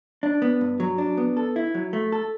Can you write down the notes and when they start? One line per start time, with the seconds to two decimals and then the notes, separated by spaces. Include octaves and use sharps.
0.23 D4
0.42 B3
0.61 G2
0.80 F#3
0.98 D4
1.17 B3
1.37 A4
1.56 E4
1.74 F#3
1.93 A3
2.12 A4